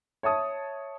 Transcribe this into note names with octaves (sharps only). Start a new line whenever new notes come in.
C#5 E5 A5 D#6